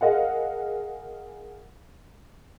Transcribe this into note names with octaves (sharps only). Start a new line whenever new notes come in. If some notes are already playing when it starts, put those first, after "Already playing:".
G#4 A#4 D#5 F5 F#5